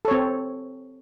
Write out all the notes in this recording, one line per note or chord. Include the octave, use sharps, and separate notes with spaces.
C4 A4 C#5